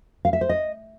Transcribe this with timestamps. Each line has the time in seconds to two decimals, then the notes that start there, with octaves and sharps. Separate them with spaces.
0.25 F5
0.33 E5
0.41 C5
0.49 D#5